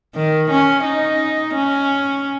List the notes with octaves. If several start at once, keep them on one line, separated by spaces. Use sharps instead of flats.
D#3
C#4
D#4
C#4